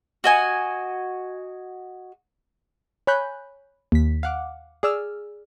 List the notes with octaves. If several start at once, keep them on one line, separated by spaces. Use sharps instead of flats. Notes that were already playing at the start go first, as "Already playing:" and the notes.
F#4 D#5 G#5
C#5 G#5 B5 F#6 G6
D#2 B6
F5 F#5 D6
G#4 D5 E6 F6